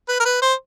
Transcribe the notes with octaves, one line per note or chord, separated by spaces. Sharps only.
B4
A#4
B4
C5